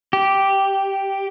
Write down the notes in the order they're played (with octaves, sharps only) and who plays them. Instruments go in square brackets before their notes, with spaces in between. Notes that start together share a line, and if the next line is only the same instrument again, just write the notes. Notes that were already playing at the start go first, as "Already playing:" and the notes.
[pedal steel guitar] G4